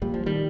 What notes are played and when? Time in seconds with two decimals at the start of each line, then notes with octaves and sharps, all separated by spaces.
0.02 A#1 A#2 G3
0.14 F3
0.26 D#3 G3